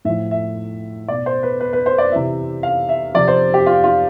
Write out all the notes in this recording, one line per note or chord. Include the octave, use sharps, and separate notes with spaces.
A2 F3 E5
E5
B2 D5
C5
B4
B4
B4
C5
D5
C3 E3 E5
F5
E5
C3 F3 D5
C5
G4
F4
F4